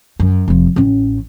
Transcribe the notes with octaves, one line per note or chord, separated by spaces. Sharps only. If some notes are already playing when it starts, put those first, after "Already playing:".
F#2
F1 F3
A1 C#4